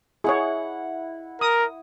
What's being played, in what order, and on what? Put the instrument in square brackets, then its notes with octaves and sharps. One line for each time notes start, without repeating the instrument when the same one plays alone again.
[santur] E4 F#5 [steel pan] G#4 C#5
[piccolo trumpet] A#4 [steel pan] D#6